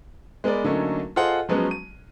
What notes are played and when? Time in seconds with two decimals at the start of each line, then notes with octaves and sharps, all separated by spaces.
0.44 G#3 B3 A#4 B4 D5
0.64 D3 F#3 A3 A#3 C#4 D#4
1.16 F4 G#4 A4 C5 D#5 F#5
1.49 F3 F#3 G#3 B3 C#4
1.71 D#7